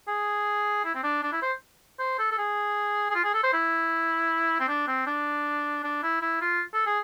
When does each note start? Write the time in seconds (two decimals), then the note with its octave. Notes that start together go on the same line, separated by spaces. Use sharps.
0.08 G#4
0.85 E4
0.95 C4
1.04 D4
1.23 D4
1.32 E4
1.42 C5
2.00 C5
2.19 A4
2.31 A4
2.38 G#4
3.10 G#4
3.15 F4
3.24 G#4
3.34 A4
3.44 C5
3.54 E4
4.60 C4
4.68 D4
4.88 C4
5.07 D4
5.84 D4
6.03 E4
6.22 E4
6.41 F4
6.74 A4
6.86 G#4